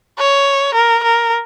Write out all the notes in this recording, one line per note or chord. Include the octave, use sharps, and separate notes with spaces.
C#5
A#4
A#4